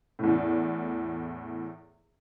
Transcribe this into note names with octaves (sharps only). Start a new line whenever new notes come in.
E2 A2